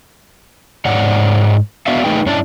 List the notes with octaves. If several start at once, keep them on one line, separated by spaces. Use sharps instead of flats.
G#2 C#5 D5 F#5
B3 D4 F#4 D5 E5 F5
A3 D#4 G#4 B4 G5
G2 C#4 D4 E4 D5 A5